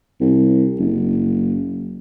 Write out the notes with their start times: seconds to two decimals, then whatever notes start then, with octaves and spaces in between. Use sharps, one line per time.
0.20 C2
0.79 F#1